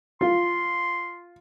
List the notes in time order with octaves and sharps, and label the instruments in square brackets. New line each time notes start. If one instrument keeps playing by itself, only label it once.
[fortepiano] F4 [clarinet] C6